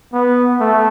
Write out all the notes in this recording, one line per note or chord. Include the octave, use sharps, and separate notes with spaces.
B3
A3